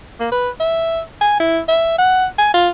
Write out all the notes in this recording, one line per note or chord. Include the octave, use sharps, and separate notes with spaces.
A#3
B4
E5
G#5
E4
E5
F#5
G#5
F4